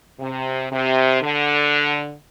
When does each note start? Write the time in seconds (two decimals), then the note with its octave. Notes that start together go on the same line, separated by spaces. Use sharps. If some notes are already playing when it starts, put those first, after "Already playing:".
0.20 C3
0.72 C3
1.22 D3